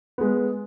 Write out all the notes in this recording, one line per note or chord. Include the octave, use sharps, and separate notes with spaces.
G#3 B3